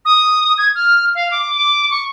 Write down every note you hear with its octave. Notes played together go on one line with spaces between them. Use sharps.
D#6
G#6
F6
F5
D6
D6
C#6